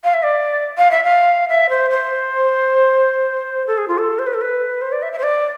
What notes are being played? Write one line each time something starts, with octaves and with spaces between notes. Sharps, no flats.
F5
E5
D5
F5
E5
F5
E5
C5
C5
A4
G#4
F4
A4
C5
B4
A4
B4
C5
D5
E5
E5
C5
D5